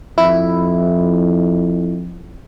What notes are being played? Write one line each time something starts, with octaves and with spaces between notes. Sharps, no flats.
F2 E4